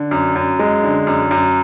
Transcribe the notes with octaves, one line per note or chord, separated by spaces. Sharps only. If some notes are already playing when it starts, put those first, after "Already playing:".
Already playing: D3
F#2
F#2
G#3
D3
F#2
F#2